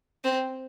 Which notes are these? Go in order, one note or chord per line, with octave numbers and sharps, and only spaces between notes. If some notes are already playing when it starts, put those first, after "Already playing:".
C4